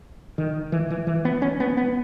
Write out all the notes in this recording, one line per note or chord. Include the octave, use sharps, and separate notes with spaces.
D#3
E3
E3
E3
B3
C#4
B3
B3